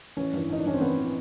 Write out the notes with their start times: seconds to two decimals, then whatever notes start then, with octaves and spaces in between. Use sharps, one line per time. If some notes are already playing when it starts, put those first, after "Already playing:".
0.17 A1 C#4
0.33 G2 E3
0.50 A1 D#4
0.59 D4
0.66 G2 E3 C#4
0.74 C4
0.81 A1 B3
0.98 E3